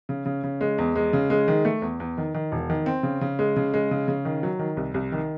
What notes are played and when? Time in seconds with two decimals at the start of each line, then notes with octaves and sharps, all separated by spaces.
0.09 C#3
0.26 C#3
0.44 C#3
0.61 G#3
0.78 E2
0.96 G#3
1.13 C#3
1.30 G#3
1.48 D#3
1.65 A3
1.82 E2
2.00 E2
2.18 D#3
2.34 D#3
2.52 E1
2.70 D#3
2.86 C4
3.03 C#3
3.21 C#3
3.39 G#3
3.56 C#3
3.74 G#3
3.91 C#3
4.08 C#3
4.25 D#3
4.43 F#3
4.59 D#3
4.77 C2
4.94 C2
5.12 D#3